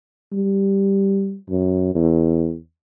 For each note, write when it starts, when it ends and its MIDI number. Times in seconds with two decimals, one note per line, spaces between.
0.32 1.36 55
1.50 1.91 42
1.95 2.55 40